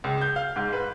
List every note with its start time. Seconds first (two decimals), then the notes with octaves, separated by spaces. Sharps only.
0.04 C#2
0.21 G6
0.36 F5
0.56 G#2
0.73 B4